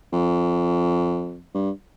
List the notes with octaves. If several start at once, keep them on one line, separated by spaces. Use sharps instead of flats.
F2
G2